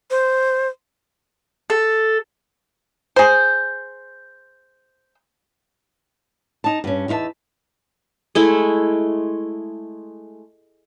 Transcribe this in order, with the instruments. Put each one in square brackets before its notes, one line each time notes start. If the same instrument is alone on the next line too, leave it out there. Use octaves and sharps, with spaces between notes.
[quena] C5
[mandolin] A4
[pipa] G#4 C5
[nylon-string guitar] D#4 A5
G2 C#4
E2 D#4 E4 E5 A5
[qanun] G#3 A3 E4